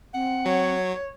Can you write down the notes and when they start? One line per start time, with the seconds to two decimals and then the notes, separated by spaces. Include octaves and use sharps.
0.14 C4 F#5
0.46 F#3 C#5